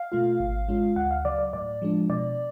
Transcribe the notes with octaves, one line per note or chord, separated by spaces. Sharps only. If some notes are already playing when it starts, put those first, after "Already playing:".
Already playing: F5
B2 A3 F4
G#1
G#2 G#3 C#4 F4
D2 F#5
F5
C#3 F#3 D5
D5
A2 D5
F3 G#3 D4
B2 D5